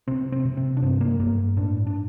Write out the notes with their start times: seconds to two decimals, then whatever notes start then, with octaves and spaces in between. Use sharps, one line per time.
0.08 C3 C4
0.32 C4
0.45 C3
0.57 C4
0.77 D4
0.82 G2 C4
1.01 A#3
1.19 G2 A#3
1.57 A2 D4
1.87 D4